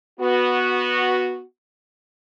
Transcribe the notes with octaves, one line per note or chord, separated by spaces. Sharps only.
B3 F#4